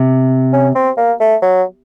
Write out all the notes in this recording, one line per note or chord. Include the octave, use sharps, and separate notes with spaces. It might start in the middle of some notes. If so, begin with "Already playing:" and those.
Already playing: C3
C#4
C4
A#3
A3
F#3